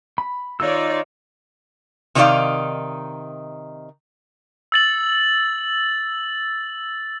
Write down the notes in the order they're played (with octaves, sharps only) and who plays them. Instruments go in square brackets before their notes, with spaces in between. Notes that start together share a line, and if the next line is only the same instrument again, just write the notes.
[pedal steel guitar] B5
[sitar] D#3 [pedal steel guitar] D#4 E6 [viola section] F4 C#5 D5
[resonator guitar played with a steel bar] C3 D#3 D#4 A4 D5 F5
[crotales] E6 A6 F#7